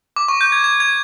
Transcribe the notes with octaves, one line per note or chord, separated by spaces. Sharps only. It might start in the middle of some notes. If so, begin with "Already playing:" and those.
D6
C#6
G6
G#6
G#6
G#6